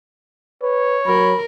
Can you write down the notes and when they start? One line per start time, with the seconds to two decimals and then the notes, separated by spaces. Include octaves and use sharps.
0.62 B4 C#5
1.06 F#3 A#4 B5